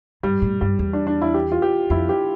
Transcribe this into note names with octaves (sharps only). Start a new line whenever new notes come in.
G2 G3
A2
G2 G3
E2
D4
D4
E4
G4
F4
G4
F2 E4
G4